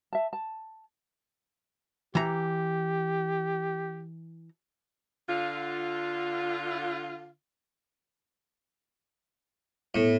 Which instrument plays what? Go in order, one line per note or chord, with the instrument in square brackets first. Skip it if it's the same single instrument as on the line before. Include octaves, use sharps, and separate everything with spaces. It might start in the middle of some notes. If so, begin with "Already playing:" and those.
[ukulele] E5 A5
A5
[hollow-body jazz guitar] E3 A#5 [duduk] G4
[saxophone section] D3 F4
[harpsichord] A2 [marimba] B3 A4